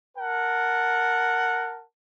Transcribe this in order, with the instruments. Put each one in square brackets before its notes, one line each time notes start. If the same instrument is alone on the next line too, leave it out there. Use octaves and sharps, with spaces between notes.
[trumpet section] A#4 F#5 A5